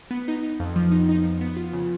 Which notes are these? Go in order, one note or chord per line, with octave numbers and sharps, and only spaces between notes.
B3
D#4
D#4
F2
F3
D#4
D#4
F3
B3
F4
C#3